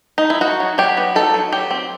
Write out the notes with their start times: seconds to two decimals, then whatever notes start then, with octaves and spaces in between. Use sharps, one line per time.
0.18 D#4
0.30 E4
0.41 D#4 F#4
0.60 F#3
0.78 F#3 G4
0.97 B3
1.15 D#4 A4
1.34 F#3
1.52 F#3 G4
1.71 C4